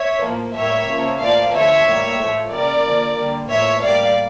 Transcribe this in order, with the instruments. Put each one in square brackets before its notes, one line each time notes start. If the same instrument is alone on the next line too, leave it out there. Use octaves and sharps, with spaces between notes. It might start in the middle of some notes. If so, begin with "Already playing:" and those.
Already playing: [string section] C#5 E5
A2 F3 A#3
A2 G3 A#3 C#5 E5
C#3 F3 A#3
A2 F3 A#3 D5 F5
D3 F3 A3 C#5 E5
A2 G3 A#3
A2 F3 A3
C#3 G3 A#3 A#4 D5
D3 F3 A#3
D3 G3 A#3
A2 F3 A#3 C#5 E5
A2 G3 A#3 D5 F5